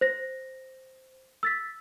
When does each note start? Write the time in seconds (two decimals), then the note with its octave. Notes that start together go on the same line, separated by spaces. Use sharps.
0.01 C5 A#6
1.43 E6 A6 B6